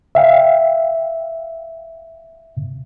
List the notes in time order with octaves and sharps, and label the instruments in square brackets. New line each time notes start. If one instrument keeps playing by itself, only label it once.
[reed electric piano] E5 F5 G5